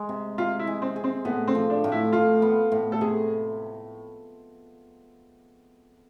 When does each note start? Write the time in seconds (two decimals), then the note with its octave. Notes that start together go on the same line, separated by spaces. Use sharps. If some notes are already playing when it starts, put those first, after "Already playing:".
Already playing: G#3
0.09 C3
0.38 C3 F4
0.59 E4
0.67 G#3
0.82 C4
0.96 G#4
1.04 C4
1.25 A2 B3
1.48 C4
1.55 F3
1.70 D4
1.84 A2
1.92 E4
2.13 A2 F4
2.42 B3
2.72 A2
2.92 A4
3.01 C3 G#4